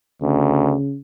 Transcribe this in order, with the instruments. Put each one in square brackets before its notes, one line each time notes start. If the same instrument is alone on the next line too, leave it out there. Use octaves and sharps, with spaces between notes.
[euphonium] D2 [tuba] C#3